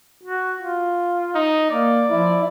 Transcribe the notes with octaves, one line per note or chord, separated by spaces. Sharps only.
F#4
F4
D#4
A#3 D5
F3 E4